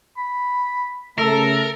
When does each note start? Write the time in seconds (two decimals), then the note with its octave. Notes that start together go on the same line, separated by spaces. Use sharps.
0.17 B5
1.19 C#3 A3 A4 A#4 E5